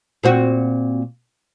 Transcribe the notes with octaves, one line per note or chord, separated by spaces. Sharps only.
A#2 C4 F#4